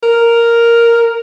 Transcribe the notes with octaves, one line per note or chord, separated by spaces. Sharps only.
A#4